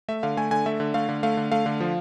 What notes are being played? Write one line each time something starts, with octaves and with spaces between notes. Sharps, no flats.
A3 E5
D3 F5
A3 G#5
D3 G#5
A3 E5
D3
A3 F5
D3
A3 F5
D3
A3 F5
D3
F3